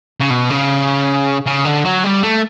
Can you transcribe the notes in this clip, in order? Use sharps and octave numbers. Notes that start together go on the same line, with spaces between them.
C#3
B2
C#3
C#3
D3
F#3
G3
A3